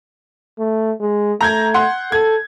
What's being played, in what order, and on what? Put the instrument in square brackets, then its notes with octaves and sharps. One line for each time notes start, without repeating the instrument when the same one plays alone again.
[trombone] A3
G#3
[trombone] A3 [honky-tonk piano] A#5 G6 G#6
[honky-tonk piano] F#5 C6
[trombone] A4 [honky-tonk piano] G#6